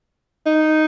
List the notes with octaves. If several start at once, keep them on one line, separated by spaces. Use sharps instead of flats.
D#4